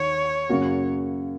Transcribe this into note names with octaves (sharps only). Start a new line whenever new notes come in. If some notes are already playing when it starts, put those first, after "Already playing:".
Already playing: D#2 D#3 C#5
F#2 C#3 A#3 C#4 F#4